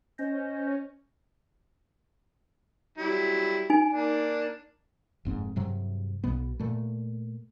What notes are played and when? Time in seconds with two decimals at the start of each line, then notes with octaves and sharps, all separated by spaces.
0.19 C#4 C5 D#5
2.98 F#3 G3 E4
3.70 D#4 G#5
3.91 A#3 D4
5.25 F1 G#2 C4
5.56 G2 C3 F#3
6.24 B1 B2 B3
6.60 A#2 A3